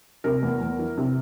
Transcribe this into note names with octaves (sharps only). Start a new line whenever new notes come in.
C3 A#4
E2
E2
E3
C3